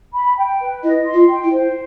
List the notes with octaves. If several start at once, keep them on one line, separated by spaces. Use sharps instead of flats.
B5
G5
B4
E4 D#5
C6
F4
G5
E4
C5